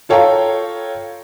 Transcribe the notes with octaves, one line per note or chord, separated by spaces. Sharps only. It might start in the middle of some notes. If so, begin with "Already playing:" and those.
F4 A4 C#5 F5 G5 A#5